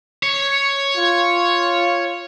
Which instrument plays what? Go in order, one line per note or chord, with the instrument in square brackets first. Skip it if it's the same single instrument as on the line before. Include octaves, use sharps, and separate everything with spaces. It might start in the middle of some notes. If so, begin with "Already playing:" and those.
[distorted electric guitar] C#5
[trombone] F4